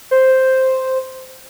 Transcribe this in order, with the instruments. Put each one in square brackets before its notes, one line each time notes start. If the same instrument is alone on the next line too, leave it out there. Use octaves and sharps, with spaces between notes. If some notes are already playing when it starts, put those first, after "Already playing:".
[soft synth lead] C5